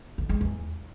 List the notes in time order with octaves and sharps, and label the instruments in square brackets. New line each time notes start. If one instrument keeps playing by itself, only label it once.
[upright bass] D3
G#3
E2